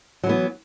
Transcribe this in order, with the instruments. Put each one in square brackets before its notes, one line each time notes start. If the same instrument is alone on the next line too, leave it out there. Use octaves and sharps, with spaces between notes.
[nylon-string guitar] F#3
E3
B3